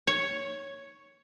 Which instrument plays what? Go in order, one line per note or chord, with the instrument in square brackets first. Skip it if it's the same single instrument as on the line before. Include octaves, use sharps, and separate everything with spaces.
[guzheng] C#5